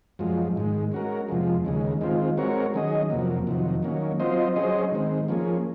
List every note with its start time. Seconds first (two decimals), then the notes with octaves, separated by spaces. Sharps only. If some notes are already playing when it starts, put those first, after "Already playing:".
0.19 F#2 F3 G#3
0.55 G#2 D#3 G#3
0.92 G#3 C#4 F#4 A#4
1.29 F2 C3 F3 G#3
1.65 D#2 C#3 G#3
2.01 D#3 G#3 C4 F4
2.37 G#3 C4 F#4 A#4 C#5
2.74 D#3 F#3 C#4 G#4 D#5
3.10 F2 C3 F#3 A#3
3.47 F2 C3 D#3 F#3
3.83 D#3 F#3 A#3 C#4
4.20 F#3 C4 F4 C5 D#5
4.56 F#3 C#4 G#4 C5 D#5
4.92 D#3 G#3 C4
5.28 F3 A#3 C#4 G#4